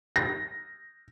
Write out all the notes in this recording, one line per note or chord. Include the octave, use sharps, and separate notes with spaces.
A#6